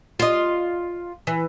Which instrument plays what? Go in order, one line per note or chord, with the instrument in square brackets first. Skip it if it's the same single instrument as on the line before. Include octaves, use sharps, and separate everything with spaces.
[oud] F4 D#5
E3